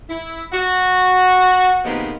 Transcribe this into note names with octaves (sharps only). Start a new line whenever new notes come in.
E4
F#4
C3 D#3 F3 G#3 A#3 B3